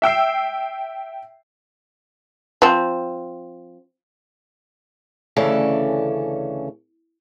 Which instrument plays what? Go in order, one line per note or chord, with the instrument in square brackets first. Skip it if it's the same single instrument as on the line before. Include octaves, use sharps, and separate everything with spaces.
[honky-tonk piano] E5 G5 E6 C7
[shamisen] F3 C4
[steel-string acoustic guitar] D2 C#3 E3 C#4 A4 D5